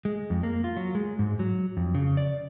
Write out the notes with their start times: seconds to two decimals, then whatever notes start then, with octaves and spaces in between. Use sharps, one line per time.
0.05 G#3
0.30 F2
0.43 A#3
0.64 F4
0.77 F#3
0.95 G#3
1.19 G#2
1.39 F#3
1.77 F2
1.95 C#3
2.17 D5